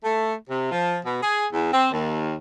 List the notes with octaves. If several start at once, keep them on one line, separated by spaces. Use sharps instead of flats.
A3
C3
F3
B2
G#4
E2
C4
D#2